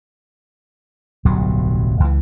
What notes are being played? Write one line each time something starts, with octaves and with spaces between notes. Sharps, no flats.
D1 B1 G2 F#3
C#2 E3